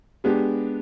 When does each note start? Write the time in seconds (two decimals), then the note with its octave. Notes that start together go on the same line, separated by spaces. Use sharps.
0.24 G#3 B3 D4 G4